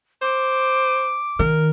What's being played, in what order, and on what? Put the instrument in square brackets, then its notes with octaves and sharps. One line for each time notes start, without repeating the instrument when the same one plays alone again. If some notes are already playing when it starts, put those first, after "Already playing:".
[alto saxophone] C5 [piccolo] D6
[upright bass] D#3 [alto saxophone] A#4